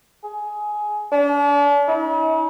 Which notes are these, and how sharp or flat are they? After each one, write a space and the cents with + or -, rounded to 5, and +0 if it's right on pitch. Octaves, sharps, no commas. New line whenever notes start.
G#4 +15
D4 -40
E4 -45